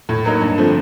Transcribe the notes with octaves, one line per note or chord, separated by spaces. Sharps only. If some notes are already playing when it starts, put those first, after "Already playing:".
A2
F#3 A#3 D#4
G2
D3 F3 A3 C4